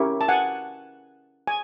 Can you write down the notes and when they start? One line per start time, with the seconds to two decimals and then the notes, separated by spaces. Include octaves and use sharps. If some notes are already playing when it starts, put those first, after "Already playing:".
Already playing: C#4 E4 G4 A#4 C#5
0.21 A5
0.28 F#5 G#5
1.47 G#5